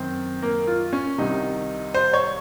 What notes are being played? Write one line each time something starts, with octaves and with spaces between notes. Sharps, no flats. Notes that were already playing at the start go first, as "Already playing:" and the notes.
Already playing: F#2 D#3 C4
A#3
F4
C#4
C2 C3 D#3 D#4
C5
C#5